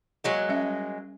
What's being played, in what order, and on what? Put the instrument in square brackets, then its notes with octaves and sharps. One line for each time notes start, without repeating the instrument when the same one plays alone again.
[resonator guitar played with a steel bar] F#3 G#3 A#3
[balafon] G3 C#4 E5